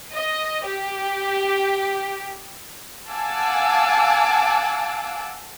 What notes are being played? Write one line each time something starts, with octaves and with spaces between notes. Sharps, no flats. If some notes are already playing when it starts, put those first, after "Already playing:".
D#5
G4
F5 F#5 G#5 A5 D6 E6